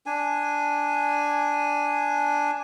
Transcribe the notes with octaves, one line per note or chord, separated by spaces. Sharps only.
D4 G#5